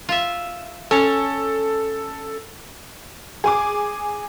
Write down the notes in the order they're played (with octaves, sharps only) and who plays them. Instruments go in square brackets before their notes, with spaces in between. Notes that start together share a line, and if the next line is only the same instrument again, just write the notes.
[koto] F4 E5
[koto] C#4 C#5 [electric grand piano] A4
[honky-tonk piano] G#4 G#5 D6